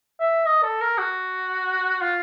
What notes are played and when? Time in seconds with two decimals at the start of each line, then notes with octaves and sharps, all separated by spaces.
0.20 E5
0.46 D#5
0.63 A4
0.81 A#4
0.98 F#4
2.01 F4